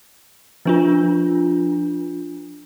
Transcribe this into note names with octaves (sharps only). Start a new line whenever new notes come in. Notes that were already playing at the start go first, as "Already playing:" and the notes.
F3 D4 F4